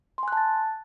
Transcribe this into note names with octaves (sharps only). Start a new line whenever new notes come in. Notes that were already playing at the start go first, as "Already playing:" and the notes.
G#5 A5 C6 F#6 A6